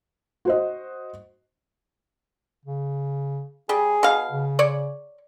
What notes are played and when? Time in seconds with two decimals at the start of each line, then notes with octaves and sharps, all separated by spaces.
0.45 F#4 C5 D#5
2.65 C#3
3.69 G3 G#4
4.03 B2 F5
4.32 C#3
4.59 C#5 D5